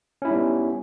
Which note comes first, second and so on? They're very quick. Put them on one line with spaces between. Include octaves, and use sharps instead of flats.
C#4 E4 D#4 G3 B3